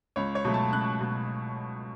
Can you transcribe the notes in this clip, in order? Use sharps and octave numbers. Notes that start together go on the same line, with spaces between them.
C#2 C#5
C#5
B2 F#3 A3
A5
C#2 F#6
B2